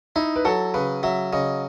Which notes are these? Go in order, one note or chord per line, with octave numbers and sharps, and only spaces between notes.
D#4 E4
B4
F#3 A4
C#3 B4
F#3 E5
C#3 D#5